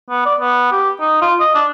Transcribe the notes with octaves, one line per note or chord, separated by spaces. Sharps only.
B3
D5
B3
G4
D#4
F4
D#5
D4